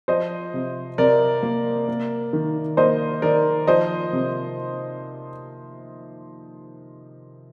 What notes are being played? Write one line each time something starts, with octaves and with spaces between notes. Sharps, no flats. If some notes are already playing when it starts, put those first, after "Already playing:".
F3 C5 D#5
C3
C3 A#4 D5
A#3
A#3
D#3
A#3 C5 D#5
D#3 A#4 D5
F3 C5 D#5
C3